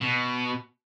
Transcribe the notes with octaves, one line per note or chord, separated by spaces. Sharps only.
B2